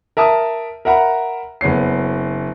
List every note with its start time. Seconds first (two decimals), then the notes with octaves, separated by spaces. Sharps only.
0.17 A#4 E5 A5 D#6
0.85 A#4 E5 F#5 A#5 B5
1.61 F#1 B3 C#4 C7